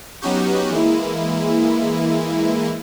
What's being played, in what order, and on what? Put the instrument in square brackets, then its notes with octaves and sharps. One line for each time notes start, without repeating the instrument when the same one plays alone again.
[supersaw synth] F#3 B3 C#4 D#4 F#4 G4
E3 G#3 A#3 E4